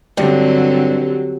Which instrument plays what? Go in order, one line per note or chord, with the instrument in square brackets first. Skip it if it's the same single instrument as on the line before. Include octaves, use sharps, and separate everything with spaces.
[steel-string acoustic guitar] G2 [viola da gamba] D3 F#3 C4